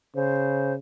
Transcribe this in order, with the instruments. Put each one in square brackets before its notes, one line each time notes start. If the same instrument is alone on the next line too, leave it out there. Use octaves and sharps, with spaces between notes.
[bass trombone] C#3 [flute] C5